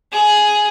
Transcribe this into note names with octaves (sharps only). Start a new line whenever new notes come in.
G#4